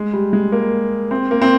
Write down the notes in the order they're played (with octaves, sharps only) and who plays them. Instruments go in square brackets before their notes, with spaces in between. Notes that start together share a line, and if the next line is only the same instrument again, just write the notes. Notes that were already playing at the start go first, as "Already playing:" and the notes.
Already playing: [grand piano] G#3
G3
G#3
A#3
C4
A#3
C4